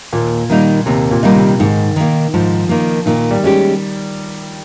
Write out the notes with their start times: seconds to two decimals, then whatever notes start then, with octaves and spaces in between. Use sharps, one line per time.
0.13 D#2 A#2
0.50 D#3 G3 A#3 D#4
0.86 D#2 C3
1.11 A#2
1.23 D#3 G3 A#3 D#4
1.36 C3
1.60 G#2 D#3
1.96 D#3 A#3
2.34 G#2 F3
2.69 D#3 A#3
3.06 A#2 D#3
3.31 G3
3.44 G#3 C#4 G4